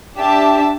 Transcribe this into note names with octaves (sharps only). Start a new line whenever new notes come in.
D4 G4 E5 A5